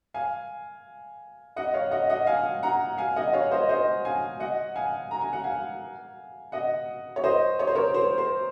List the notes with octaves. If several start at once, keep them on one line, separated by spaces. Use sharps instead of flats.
F5 G#5
D#5 F#5
C#5 F5
D#5 F#5
D#5 F#5
F5 G#5
F#5 A#5
F5 G#5
D#5 F#5
C#5 F5
C5 D#5
C5 D#5
F5 G#5
D#5 F#5
F5 G#5
A#5
G#5
F#5
F5 G#5
D#5 F#5
C#5
C5 D#5
C#5
C5
A#4 C#5
C5
C5